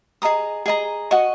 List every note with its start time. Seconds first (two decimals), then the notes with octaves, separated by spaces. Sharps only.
0.22 G#4 D#5 A#5 D#6
0.66 G#4 D#5 A#5
1.11 F#4 D#5 F#5 C#6